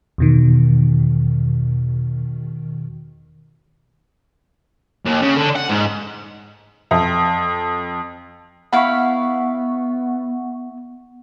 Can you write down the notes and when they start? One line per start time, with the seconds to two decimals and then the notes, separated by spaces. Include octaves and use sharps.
0.18 E2 B2 D#3
5.06 D#2
5.21 C#3
5.37 D3
5.56 F#5
5.70 G#2
6.91 F2
8.73 B3 E4 F5 F#5 B5 C#6